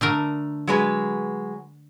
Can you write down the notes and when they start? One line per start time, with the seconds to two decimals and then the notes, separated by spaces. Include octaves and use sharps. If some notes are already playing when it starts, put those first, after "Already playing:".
0.01 D3 A3 A#4
0.67 F#3 G#3 B4